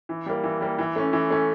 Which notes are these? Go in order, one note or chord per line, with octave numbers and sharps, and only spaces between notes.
E3
G3 A#3
E3
G3 A#3
E3
A3 C#4
E3
A3 C#4